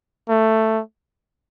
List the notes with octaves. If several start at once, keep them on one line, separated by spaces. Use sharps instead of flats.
A3